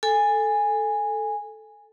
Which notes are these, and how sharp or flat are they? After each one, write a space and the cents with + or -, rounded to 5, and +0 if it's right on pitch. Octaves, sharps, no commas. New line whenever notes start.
A4 +0 G#5 -15